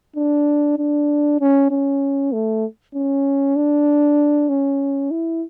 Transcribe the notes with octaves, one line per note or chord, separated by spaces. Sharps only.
D4
D4
C#4
C#4
A3
C#4
D4
C#4
E4